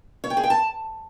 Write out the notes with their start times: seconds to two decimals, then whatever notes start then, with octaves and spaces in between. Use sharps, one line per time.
0.24 C#5
0.30 G5
0.37 G#4
0.43 G5
0.50 A5